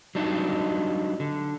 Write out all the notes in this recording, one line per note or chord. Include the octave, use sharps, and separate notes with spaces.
F#3 G3 D4 D#4
D3